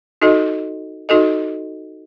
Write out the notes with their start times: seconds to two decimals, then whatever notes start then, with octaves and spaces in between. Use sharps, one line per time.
0.22 D#4 F#4 A4 D#5
1.09 D#4 F#4 A4 D#5